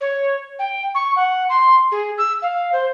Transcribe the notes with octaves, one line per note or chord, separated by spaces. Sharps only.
C#5
G5
C#6
F#5
C6
G#4
E6
F5
C5